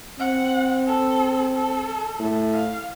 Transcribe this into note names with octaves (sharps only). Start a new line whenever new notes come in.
C4 F#5
A4
A4
A2
F5